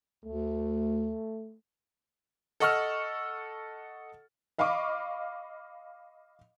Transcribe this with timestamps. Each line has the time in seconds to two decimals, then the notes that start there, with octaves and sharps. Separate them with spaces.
0.25 D2 A3
2.60 A4 D#5 F#5 C#6 E6 F6
4.58 D#5 F5 B5 C#6 D6